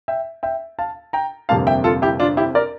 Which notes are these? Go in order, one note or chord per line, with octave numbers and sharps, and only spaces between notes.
E5 G5
E5 G5
F5 A5
G5 A#5
G1 F2 C3 G3 A#3 F5 A5
E5 G5
F4 A4
E4 G4
D4 F4
E4 G4
A#4 D5